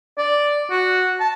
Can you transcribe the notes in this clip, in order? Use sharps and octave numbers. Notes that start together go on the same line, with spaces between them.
D5
F#4
A5